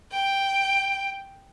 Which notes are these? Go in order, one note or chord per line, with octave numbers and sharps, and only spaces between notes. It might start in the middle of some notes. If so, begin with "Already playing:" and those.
G5